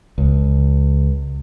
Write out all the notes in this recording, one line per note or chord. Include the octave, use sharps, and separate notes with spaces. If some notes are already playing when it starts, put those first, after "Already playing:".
C#2